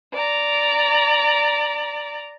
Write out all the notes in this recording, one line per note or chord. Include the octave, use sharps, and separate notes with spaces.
D5 A#5